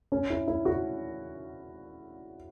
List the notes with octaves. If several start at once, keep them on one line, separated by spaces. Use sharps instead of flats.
C#4
E4
E4
F#4